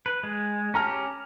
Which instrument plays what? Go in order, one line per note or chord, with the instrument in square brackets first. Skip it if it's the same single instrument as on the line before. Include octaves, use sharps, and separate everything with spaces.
[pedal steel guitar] B4
G#3
[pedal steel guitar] C#4 G4 [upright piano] A5 A#5 F6